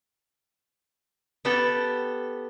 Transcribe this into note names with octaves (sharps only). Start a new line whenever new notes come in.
B3 G4 A4 G5